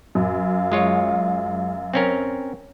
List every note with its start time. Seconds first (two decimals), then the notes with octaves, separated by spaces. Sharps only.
0.15 F#2 F5
0.72 G#3 F4 C#5
1.94 C4 C#4 A#4